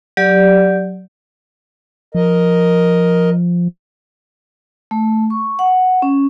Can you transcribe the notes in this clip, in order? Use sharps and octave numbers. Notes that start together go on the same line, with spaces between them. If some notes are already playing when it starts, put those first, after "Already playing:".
F#3 G4 D5
F3 A#4 D#5
A3
C#6
F#5
C#4